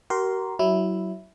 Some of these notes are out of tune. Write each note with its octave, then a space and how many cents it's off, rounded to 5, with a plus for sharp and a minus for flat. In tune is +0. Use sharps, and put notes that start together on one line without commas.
F#4 +45 A#4 +5 C6 +0
F#3 +25 E4 +0